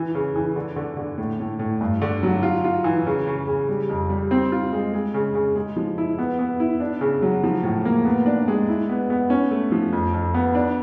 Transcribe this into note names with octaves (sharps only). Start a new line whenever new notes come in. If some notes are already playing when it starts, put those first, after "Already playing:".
Already playing: E3
C#3
E3
D3
D3
D3
A2
A2
A2
G2
D3
F#3
F4
F4
E3
C#3
C#3
C#3
G3
F2
G3
C4
F4
G#3
G#3
C#3
C#3
G#3
F3
E4
B3
B3
E4
D4
C#3
F#3
F3
A2
A#3
B3
D4
G#3
E4
B3
B3
C#4
A3
F3
F2
F2
B3
D4